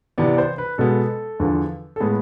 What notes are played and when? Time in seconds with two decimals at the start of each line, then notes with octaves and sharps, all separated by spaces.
0.18 C3 E3 B3 D5
0.33 D5
0.38 C5
0.58 B4
0.78 B2 G#3 B3 A4
1.40 E2 D3 F3
1.96 A4
2.00 A2 G#3 B3 G#4